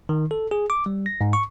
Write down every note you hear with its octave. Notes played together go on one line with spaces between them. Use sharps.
D#3
A4
G#4
D6
G3
A#6
G#2
C#6